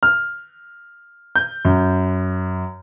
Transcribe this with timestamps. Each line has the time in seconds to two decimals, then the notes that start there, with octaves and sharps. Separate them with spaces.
0.03 F6
1.36 G6
1.65 F#2